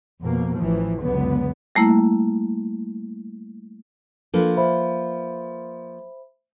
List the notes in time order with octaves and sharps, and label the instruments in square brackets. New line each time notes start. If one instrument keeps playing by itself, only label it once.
[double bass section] F2 B2 A#3
A1 E3 F3
C#2 F#2 D3 B3
[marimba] G3 A3 A#3 E4
[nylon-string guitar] F3 A#3 B4 [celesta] D4 A4
[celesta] C5 E5 B5